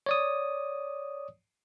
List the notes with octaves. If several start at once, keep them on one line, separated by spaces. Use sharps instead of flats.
C#5 D5 D#6